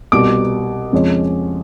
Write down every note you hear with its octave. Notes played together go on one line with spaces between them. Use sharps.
C2 B2 G3 D6
F2 C#3 F3 G#3 C#4